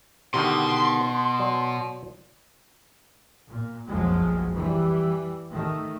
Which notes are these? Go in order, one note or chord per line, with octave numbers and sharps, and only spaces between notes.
B2 D3 D#3 G4 C6
F#3 D5 G#5
A#2
F#1 B1 F2 F3 F#3 G#3
E3 G3
D#3 A3